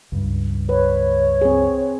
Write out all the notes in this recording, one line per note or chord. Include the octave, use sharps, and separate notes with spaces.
C#2 G2
B4 C#5
C4 G#4